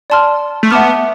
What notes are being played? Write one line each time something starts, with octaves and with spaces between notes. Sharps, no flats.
D5 A5 C6 F6
A3
B3 E5 A5 D6 F6